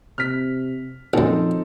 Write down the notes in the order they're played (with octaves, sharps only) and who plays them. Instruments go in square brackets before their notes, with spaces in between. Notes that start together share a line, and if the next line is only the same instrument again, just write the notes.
[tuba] C3 [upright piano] F6 B6
[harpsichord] A#1 F#2 [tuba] F3 [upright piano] C4 D#4 A4